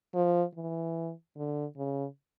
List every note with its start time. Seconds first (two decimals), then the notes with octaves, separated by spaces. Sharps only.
0.15 F3
0.55 E3
1.37 D3
1.77 C#3